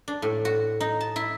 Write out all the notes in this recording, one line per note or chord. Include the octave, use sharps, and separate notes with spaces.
D4
A2
F#4
D#4
A5
E4